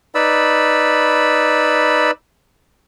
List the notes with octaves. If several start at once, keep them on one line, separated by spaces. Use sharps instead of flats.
D#4 B4 D5 B5 E6